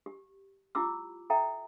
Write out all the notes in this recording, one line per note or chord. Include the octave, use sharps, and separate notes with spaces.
G4
E4 F4 G4 D6 E6
A4 E5 G5 A#5